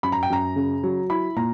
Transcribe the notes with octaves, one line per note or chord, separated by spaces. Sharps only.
F#2 B5
A#5
G5
F#2 A#5
C#3
F#3
E4 B5
A#2 A#5